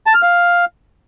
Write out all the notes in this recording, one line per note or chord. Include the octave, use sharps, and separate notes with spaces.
A5
F6
F5